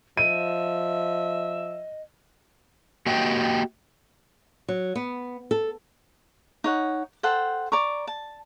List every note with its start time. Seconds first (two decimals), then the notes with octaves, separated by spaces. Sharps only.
0.17 F3 D#5 E5 D#7
3.06 A#3 F#4 G4 D#5 G5
4.68 F#3
4.96 B3
5.51 A4
6.64 D#4 C#5 F#5
7.23 A4 C5 F#5 G5
7.72 D5 A#5 C#6
8.07 A5